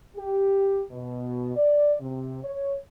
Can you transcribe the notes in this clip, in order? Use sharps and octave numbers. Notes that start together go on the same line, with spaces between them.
G4
B2
D5
C3
C#5